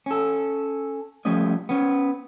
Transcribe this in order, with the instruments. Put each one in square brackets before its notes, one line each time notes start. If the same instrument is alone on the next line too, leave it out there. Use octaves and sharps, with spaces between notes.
[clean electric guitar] C#4 A4
F3 G3 A3 C#4 D#5
B3 C#4